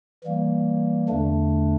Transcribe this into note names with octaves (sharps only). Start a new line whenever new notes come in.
E3 G3 A#3
E2 D3 A3 D4